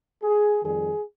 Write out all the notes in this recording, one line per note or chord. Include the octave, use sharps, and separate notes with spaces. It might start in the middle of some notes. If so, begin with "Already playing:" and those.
G#4
F2 D#3 G3 G#4